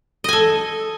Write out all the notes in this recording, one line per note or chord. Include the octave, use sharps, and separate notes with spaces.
A4 D#5 G#5